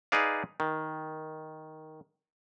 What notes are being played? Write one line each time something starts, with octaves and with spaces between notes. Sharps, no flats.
D#4 G#4 B4 D5 F5
D#3